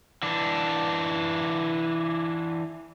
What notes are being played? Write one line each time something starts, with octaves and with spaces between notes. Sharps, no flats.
E3 D4